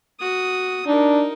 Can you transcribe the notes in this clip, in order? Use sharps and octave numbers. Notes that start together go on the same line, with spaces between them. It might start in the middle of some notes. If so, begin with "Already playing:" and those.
F#4 D#6
D4 D#4 A#4